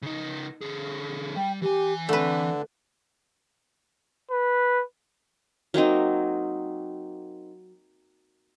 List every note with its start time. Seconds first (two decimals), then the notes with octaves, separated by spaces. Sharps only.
0.02 C#3 D#4
0.61 D3 G#4
1.37 G3 G5
1.62 E3 G4 G#5
2.09 D3 A3 C4 B4
4.31 B4
5.74 F#3 A#3 C4 D#4